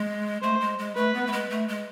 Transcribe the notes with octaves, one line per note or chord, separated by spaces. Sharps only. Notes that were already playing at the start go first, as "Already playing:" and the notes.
Already playing: G#3
A3 C5
G#3
G#3
A3 B4
B3
A3
G#3
A3
G#3